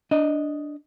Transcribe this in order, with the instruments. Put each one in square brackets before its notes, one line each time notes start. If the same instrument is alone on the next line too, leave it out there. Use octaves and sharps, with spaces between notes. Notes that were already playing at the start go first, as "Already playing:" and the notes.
[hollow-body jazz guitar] D4 D#5